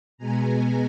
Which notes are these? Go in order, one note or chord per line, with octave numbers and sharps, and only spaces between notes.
B2 G#3 B3 G#5 A#5